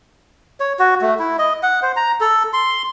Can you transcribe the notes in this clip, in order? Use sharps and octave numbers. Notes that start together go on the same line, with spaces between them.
C#5
F#4
A3
E4
D#5
F#5
C5
A#5
A4
C6